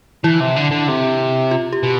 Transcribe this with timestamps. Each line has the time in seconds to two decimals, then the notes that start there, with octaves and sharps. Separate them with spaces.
0.24 E3 E4
0.40 C3
0.56 D3
0.71 D3
0.88 C3
1.51 F4
1.73 G4
1.83 B2